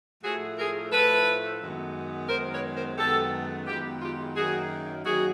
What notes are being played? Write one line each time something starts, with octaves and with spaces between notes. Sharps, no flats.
A2 F3 A3 F#4 G#4
G#4 A#4
A2 F3 A3 A4 B4
F#2 D#3 G#3 B3
F#2 D#3 G#3 B3 A#4 C5
B4 C#5
A#4 C5
F#2 D#3 G#3 B3 G4 A4
F#2 D#3 G#3 B3 F4 G4
F4 G4
F#2 D#3 F#3 A#3 F#4 G#4
F#2 D#3 F#3 A#3 F#4 G#4